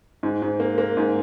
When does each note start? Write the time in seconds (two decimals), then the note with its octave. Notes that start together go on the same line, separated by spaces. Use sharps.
0.23 G#2
0.42 G#2
0.60 A#3
0.78 A#3
0.97 G#2